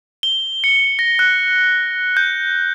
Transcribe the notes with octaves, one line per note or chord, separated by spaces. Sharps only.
G7
C#7
A#6
F#6
G6